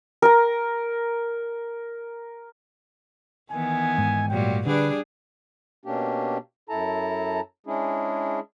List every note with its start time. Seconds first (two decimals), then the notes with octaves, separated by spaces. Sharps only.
0.22 A#4 A#5
3.52 D#3 E3 B3 G#5
3.98 G#2
4.29 A#2 F#3 G3 G5
4.66 D3 G3 D4 G#4 B4
5.85 B2 A#3 C#4 D4 G4
6.69 F#2 E4 A4 A5 A#5
7.66 G#3 C#4 D4 E4 G#4